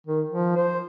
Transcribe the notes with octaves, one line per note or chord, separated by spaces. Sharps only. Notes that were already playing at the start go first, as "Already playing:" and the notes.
D#3
F3
C5